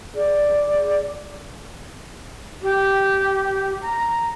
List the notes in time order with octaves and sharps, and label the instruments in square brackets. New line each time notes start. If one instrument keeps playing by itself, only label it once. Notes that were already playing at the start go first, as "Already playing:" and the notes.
[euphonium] G#4 [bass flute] D5
[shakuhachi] G4
A#5